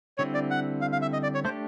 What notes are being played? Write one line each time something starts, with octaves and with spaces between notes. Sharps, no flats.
D3 G3 C4 E4 C#5
D5
F#5
F5
F5
E5
D#5
D5
C#5
A3 D4 G4 C5